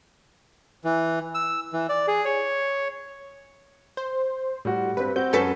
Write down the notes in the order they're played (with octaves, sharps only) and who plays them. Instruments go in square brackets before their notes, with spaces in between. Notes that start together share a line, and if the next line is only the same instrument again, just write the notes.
[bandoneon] E3
E6
E3
D5
G#4
C#5
[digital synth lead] C5
[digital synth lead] A2 [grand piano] G3 F#4
[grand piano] G2 C4 [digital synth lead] B4
[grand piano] C4 F#4 [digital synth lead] G6
[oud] F#2 A4 B4 [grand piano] C#4 F#4